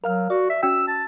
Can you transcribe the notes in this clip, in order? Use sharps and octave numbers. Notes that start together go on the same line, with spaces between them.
F#3 A#4 F5 F6
F#4 D5
E5
C#4 F#4 G5 E6
A5